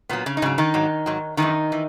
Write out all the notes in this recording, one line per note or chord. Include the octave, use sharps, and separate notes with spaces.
A#2 F#3 B3
C#3 C#4
D#4
G#2 C#3 F#3 C#4
D#3 D#4
G#2 F#3
G#2 F#3
F#2 D#3 E3 G#3 D#4
E3